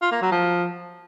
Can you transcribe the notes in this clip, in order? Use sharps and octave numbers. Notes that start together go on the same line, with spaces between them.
F4
A#3
F#3
F3